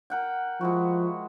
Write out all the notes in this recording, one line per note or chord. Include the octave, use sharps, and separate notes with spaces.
A#4 F#5 G5
F3 G#3 E4 F#4